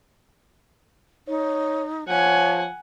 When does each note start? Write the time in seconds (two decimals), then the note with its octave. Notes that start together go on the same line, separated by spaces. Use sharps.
1.28 D#4 C#5
2.08 F3 C#5 F#5 G#5